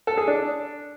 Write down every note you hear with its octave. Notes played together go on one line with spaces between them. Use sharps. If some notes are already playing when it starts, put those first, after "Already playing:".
A4
G#4
D4